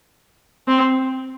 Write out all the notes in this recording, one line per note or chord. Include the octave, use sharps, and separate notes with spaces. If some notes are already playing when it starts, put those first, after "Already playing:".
C4